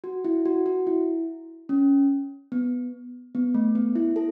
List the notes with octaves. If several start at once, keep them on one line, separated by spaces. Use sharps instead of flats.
F#4
E4
F#4
F#4
E4
C#4
B3
B3
A3
B3
E4
A4